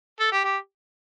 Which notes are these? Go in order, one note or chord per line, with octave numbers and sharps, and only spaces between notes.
A4
G4
G4